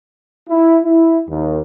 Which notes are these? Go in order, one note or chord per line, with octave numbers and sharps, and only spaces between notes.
E4
E4
D#2